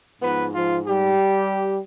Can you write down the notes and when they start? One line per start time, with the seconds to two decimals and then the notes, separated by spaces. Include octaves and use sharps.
0.21 G#2 F3 B3 B4
0.54 F3 F4
0.87 G3 G4